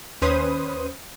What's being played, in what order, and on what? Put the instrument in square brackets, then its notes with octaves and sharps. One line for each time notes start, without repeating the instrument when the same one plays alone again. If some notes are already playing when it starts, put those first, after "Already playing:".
[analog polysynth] D#2 C#4 B4 C5 D#6